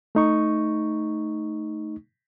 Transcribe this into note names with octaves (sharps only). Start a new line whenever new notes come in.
A3 D#4 C#6